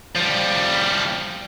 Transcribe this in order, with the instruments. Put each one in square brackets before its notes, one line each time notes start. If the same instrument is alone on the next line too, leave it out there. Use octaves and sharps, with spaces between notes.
[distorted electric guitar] F3 G3